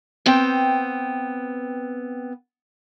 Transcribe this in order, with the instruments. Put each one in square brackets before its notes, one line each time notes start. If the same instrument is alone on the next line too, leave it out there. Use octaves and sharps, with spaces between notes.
[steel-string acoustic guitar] B3 C4 G5